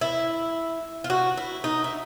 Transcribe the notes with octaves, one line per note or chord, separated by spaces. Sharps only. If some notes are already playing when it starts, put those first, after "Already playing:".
E4
F4
F#4
E4
D#4
E4